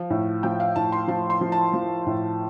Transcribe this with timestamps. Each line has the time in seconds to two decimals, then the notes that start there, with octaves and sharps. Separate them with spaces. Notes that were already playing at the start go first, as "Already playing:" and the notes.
Already playing: F3
0.10 A2
0.43 F3 G5
0.60 F5
0.76 A2 A5
0.92 C6
1.08 F3 A5
1.30 C6
1.41 F3
1.52 A5
1.74 F3
2.06 A2